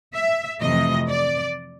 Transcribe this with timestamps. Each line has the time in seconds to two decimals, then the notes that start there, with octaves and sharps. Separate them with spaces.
0.14 E5
0.61 F2 C3 E3 A3 D#5
1.09 D5